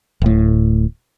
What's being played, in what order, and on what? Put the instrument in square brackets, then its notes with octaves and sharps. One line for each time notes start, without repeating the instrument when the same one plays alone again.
[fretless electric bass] D1 A2